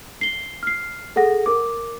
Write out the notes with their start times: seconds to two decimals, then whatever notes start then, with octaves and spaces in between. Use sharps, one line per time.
0.21 C7 G7
0.63 F6 C7
1.16 G#4 A4 F#5 A#6
1.46 A#4 D6